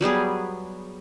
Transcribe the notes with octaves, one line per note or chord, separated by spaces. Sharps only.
F#3 G3 B3 G#4